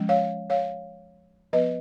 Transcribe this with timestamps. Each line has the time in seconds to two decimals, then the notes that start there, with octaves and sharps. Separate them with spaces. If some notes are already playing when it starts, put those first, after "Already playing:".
Already playing: F3 G#3 C#4
0.09 C#5 F5
0.50 C#5 F5
1.53 F3 B3 B4 D#5